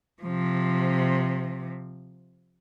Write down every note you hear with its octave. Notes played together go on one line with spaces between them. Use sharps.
C3 F3